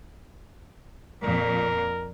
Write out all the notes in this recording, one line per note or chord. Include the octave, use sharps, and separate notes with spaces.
F2 A#2 A#4